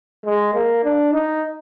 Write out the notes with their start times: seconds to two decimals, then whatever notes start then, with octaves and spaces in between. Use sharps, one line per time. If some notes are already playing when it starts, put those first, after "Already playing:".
0.25 G#3
0.54 A#3
0.84 D4
1.13 D#4